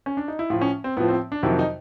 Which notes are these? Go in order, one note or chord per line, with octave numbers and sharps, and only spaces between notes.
C#4
D4
D#4
E4
A2 F3 F4
C#4
C4
A2 F3 B3
C4
D4
F2 C3 D#3 F#3 E4
D#4